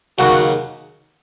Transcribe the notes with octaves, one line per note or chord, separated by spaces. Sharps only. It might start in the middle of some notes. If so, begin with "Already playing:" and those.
D#2 C#3 F#3 F#4